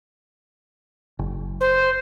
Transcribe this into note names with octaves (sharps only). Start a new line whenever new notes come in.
F#1
C5